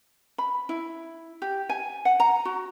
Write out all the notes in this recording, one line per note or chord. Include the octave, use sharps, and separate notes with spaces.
B5
E4
G4
G#5
F#5
A#5
F#4